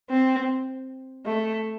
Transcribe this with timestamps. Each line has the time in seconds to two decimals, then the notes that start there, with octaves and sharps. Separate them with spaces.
0.10 C4
1.26 A3